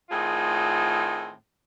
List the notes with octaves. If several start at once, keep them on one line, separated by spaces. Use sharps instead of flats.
A2 D#3 C4 F4 G#4